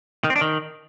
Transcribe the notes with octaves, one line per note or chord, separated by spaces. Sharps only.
D#3
C4
D4
D#3